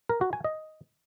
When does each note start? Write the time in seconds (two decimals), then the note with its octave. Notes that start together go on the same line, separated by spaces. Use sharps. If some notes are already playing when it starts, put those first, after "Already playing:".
0.09 A#4
0.21 F#4
0.33 G#5
0.44 D#5